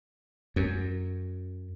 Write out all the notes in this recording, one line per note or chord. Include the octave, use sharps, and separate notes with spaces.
F#2